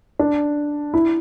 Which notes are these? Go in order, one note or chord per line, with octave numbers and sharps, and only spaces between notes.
D4
E4